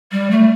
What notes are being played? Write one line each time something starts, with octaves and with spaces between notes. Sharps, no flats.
G3
A3